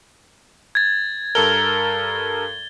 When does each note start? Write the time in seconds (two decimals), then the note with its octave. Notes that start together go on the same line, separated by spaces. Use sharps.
0.75 G#6 A6
1.35 G2 A4 A#4 G7